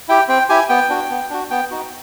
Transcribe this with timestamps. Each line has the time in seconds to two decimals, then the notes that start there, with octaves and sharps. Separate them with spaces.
0.09 E4 G4 G5
0.28 C4 G5
0.49 E4 G4 G#5
0.69 B3 G5
0.90 D4 F#4
1.10 B3
1.30 D4 F#4
1.50 B3 G5
1.71 D#4 F#4